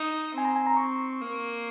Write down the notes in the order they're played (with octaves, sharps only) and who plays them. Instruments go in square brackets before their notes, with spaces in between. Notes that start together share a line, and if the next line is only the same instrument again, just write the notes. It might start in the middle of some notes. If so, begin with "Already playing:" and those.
Already playing: [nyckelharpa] D#4
[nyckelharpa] C4 [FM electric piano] G#5
[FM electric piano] A#5
G#5
A#5
C#6
[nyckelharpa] A#3